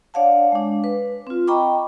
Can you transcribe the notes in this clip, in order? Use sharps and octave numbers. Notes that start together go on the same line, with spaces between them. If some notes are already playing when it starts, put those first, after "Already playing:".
D4 C#5 D5 F5 F#5 A5
G#3 D4
B4 D6
C4 F4
D#5 G5 A#5 B5 C#6 D6